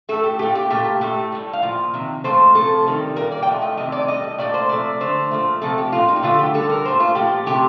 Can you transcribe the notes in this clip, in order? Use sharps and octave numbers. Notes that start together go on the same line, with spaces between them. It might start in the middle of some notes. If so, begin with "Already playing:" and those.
A2 A3 A4
G4
A#2 F3 A3 G4
G4
A#2 A3 G4
A2 A3 G4
A2 G3
F5
A#2 F3
C3 D#3
A#2 F3 A3 C5
C3 F3 A3 A4
C3 D#3 G3
A#2 G3 A#4
D5
G5
A2 F3 A3
D#5
C3 D#3 A3 D#5
D5
A2 G3 D#5
D#5
A#2 A3 D5
C5
C3 F3 A3 D5
D3 A3 C5
A#2 F3 A3
C3 F3 A3 A4
G4
A#2 G3 F4
D#4
G4
D3 F3 A3 F4
G4
D3 G3 A4
A#4
A#2 A3 C5
F4
A#2 F3 A3 G4
C3 F3 A3 G4